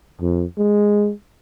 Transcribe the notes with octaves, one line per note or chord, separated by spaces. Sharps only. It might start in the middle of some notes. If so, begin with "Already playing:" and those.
F2
G#3